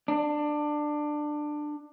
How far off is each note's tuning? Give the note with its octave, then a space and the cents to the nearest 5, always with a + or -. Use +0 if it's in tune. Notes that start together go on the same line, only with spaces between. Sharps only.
D4 +20